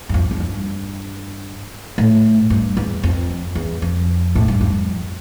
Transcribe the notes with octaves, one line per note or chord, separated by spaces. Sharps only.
G2
F2
F2
G2
A2
G2
E2
F2
E2
F2
A2
G2
F2